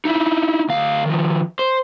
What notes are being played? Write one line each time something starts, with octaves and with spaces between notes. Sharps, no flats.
D#4 E4
D2 F5
D#3 F3
C5